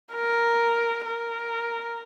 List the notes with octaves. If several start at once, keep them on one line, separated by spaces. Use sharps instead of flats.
A#4
A#4